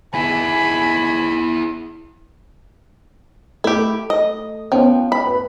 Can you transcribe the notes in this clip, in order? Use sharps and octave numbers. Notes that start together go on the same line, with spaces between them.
E4 G#4 G#5 B5
A3 E4 G4
D#5
F3 B3 C#4 G5
B5
B4